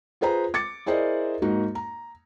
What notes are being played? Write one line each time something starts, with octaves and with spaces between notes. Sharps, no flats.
F4 G#4 B4 C5 A#5
D6 A6 C#7
E4 G#4 A#4 C5 D5 D#5
G#2 A#3 D#4 F#4
A#5